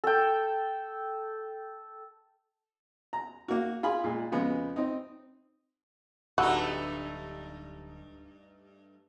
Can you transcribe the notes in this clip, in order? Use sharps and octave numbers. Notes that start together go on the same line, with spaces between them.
A4 G5
A#5
A#3 F#4
F4 G#4 B5
A#2 G#3
F2 C#3 G#3 B3
C4 D#4
D1 G2 A3 D#4 F#4 A5 B5 E6